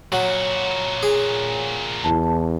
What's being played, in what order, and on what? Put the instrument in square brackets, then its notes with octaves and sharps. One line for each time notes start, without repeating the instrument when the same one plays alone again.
[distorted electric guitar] A#2 F#4 [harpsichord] F#3 [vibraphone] C#5
[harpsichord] G#4
[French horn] E2 [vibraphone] E4 A5